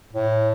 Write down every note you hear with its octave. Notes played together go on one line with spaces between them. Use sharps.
A2